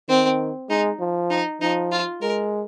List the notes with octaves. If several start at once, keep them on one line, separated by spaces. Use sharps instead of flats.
D#3 C4
G#3 D#4
F3
D#4
F3 D#4
F4
G#3 A#4